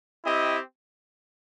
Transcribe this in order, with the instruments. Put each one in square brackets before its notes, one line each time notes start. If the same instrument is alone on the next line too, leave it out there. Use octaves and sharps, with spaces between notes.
[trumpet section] C4 E4 G4 D#5